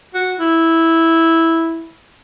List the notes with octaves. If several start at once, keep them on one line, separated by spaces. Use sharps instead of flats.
F#4
E4